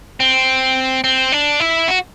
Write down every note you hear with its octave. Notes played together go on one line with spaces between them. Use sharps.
C4
C4
D4
E4
F#4